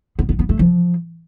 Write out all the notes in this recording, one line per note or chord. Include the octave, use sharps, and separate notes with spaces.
B3
B3
B3
A3
F3